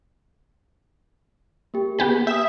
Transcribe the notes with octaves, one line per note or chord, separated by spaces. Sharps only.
A#3 G4
B3 G4 G#4 B6
E5 D#6 G6